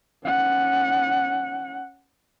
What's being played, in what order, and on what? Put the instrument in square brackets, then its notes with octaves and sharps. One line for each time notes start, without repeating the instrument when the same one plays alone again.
[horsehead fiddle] C#4 F#5